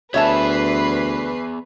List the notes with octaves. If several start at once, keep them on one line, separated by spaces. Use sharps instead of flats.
D2 B3 G#4 B4 C#5 E5 A5 C7